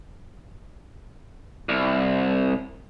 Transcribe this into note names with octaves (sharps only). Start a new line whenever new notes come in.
C2